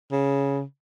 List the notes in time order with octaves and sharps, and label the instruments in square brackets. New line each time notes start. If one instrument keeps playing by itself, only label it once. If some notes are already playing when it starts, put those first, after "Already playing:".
[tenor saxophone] C#3